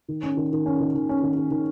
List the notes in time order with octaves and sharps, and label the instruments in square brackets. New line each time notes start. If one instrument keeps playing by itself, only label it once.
[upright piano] D#3
C#4
D#3
D#3
C#4
D#3
D#3
C#4
D#3
D#3
D#3